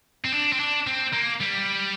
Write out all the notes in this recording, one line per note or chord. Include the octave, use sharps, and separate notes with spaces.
C4
D4
C4
D4
C4
A#3
G3